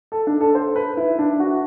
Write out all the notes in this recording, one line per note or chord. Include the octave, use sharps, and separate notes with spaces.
A4
D4
A4
C5
B4
E4
D4
F#4